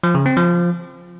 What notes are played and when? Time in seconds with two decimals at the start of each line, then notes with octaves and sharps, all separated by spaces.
0.04 F3
0.15 C#3
0.26 C4
0.37 F3